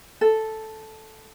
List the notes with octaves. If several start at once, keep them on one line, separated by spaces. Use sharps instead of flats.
A4